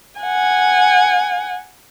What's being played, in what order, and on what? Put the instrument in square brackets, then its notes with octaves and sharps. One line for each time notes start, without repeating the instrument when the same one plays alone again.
[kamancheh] F#5 G#5